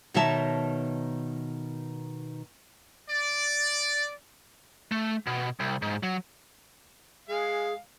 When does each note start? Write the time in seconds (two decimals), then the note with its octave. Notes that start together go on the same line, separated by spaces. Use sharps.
0.14 B2 D#3 D#4 C#5 E5 A5
3.10 D5
4.92 A3
5.27 B2
5.60 C2
5.82 G#2
6.03 F#3
7.29 G#3 G#4 F5